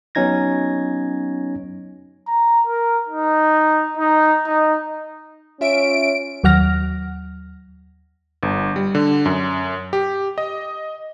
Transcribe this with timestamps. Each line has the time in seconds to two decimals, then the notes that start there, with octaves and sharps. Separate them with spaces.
0.15 F#3 B3 C#4 D#4 G#6 A#6
2.28 A#5
2.67 A#4
3.09 D#4
3.98 D#4
4.47 D#4
5.61 C#4 F4 E5 D7
6.44 D#2 F#3 F#5 F6 A#6
8.43 G1
8.76 G3
8.95 D3
9.25 F#2
9.93 G4
10.38 D#5